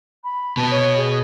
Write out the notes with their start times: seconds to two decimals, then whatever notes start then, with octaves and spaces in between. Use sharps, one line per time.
0.24 B5
0.57 B2 B3 A5
0.71 C#5
0.97 G#4